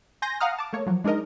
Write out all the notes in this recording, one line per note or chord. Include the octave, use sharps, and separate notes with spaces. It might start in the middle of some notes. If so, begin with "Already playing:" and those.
G#5 C6 G6 A#6
F5 F#5 A#5 D#6 F6
A5 D6
A3 A#3 C#5
F3 F#3
G#3 D4 D#4 A#4 D#5